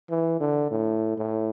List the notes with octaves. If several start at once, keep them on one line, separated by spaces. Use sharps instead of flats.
E3
D3
A2
A2